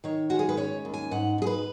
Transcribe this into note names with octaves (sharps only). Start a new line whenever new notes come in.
D#3 C#5
G#3 F#4
G#4
B4
C#4 C#5
D#2
G#5
G#2 F#5
G#2 G#4
B4